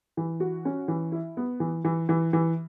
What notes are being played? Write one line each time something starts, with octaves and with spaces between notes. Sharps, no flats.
E3
F#4
C#4
E3
E4
B3
E3
E3
E3
E3